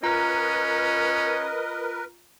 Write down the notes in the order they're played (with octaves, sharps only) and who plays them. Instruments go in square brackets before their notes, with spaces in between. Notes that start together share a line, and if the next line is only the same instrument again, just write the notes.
[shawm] C#4 [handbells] F4 A#5 [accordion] A#4 B4 [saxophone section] D#5